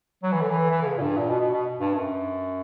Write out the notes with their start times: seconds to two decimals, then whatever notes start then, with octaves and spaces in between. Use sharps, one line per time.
0.23 F#3
0.32 E3
0.41 D3
0.50 E3
0.71 E3
0.82 D3
0.86 C#3
0.97 A#2
1.02 G2
1.17 A#2
1.29 B2
1.40 B2
1.53 B2
1.79 G2
1.95 F#2